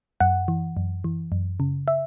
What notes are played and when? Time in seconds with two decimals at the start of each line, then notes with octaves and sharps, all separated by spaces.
0.21 F#2 F#5
0.48 E3
0.77 F#2
1.04 E3
1.32 F#2
1.60 C#3
1.88 E5